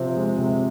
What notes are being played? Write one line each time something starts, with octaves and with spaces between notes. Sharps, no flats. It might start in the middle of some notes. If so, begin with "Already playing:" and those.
Already playing: C3 F3 C4
G#3
C3